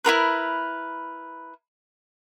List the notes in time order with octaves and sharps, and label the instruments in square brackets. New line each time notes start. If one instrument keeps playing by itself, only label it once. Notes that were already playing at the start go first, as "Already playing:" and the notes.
[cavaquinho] E4 F4 A#4 B4